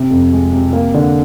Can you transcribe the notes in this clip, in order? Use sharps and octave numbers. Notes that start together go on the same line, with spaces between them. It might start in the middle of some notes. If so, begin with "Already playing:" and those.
Already playing: C3
F2
G#3
C3
A#3
D3